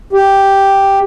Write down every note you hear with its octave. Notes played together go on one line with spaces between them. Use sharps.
G4